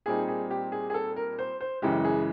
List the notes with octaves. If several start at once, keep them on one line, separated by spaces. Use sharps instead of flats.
A#2 G3 C4 D#4 G#4
G#4
G4
G#4
G#4
A4
A#4
C5
C5
F#2 C#3 E3 G#3 G4
G#4